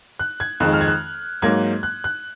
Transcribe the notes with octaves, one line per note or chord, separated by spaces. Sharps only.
F#6
G#6
F2 D#3 G#3 F#6
F6
G#6
F#6
G#2 F#3 A#3 G#6
F#6
F#6